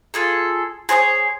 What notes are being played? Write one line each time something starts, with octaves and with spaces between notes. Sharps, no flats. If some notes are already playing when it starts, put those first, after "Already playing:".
F4 G#4 A4
G#4 C5 C#5 D#6